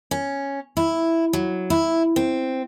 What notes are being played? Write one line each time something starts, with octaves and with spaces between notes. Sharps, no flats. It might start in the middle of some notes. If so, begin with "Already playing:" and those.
C#4
E4
F#3
E4
C4